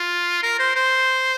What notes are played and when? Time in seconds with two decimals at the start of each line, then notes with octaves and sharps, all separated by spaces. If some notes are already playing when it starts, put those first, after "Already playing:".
Already playing: F4
0.43 A#4
0.59 C5
0.76 C5